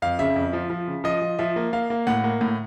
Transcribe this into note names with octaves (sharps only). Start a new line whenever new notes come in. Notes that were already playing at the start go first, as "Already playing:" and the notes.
F2 F5
C#3 E5
F2
F3
F3
C#3
F3 D#5
F3
F3 E5
A#3
A#3 F5
A#3
A2 F#5
A#3
A2